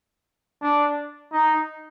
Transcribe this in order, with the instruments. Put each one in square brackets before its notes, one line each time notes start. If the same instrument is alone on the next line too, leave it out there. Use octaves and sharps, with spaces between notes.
[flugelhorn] D4
D#4